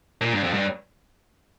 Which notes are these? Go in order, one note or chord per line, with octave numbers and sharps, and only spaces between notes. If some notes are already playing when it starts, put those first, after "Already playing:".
A#2
G2
F2
G2